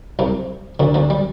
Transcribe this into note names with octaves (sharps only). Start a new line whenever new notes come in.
C2 C3
D2 D3
D2 D3
G3